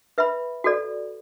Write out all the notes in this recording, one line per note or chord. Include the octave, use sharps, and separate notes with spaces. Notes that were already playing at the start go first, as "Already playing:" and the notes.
B4 E5 B5
F#4 A4 D5